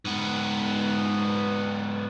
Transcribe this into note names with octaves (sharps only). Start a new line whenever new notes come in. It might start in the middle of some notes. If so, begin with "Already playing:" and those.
G#2 B3